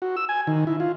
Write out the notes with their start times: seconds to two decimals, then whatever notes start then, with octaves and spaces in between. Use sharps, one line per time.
0.02 F#4
0.17 E6
0.29 G#5
0.47 D#3
0.67 E4
0.80 F4